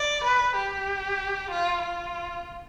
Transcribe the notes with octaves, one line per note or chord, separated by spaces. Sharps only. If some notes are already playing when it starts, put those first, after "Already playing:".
Already playing: D5
B4
G4
F4
F4